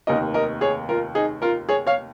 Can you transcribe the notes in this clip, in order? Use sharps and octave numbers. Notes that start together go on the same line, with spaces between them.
F1 D#2 D#3 A#4 D#5
A#4 D#5
G#4 C#5
F4 A#4
D#4 G#4
F4 A#4
G#4 C#5
C#5 F5